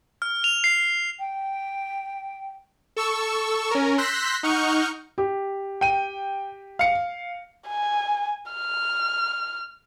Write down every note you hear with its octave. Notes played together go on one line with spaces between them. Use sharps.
F6
F7
C7
G5
A4 C#6 E6
C#4 A#4
C6 E6 F#6 G6 A#6 B6
D#4 F#5 C#6 F6 G6
G4
G5 D#7
F5 C#7
G#5
F6